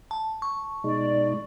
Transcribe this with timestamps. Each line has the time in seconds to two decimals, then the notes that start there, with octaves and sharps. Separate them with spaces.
0.11 A5
0.42 C#6
0.84 B2 G#3 D#4 D5